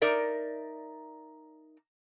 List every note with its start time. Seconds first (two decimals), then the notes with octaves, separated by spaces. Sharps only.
0.02 D#4 A#4 D5 E5